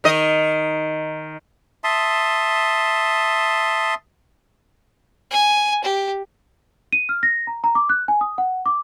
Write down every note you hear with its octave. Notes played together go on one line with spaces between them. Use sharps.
D#3 D#5
E5 A5 C6 D#6
G#5
G4
D#7
F6
A#6
A#5
A#5
D6
F#6
G#5
D#6
F#5
D6